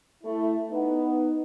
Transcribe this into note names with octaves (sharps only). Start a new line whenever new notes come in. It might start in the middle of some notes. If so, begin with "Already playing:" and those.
A3 E4
B3 D#4